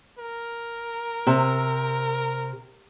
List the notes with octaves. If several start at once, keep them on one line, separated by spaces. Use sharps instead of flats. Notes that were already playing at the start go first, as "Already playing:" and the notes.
A#4
C3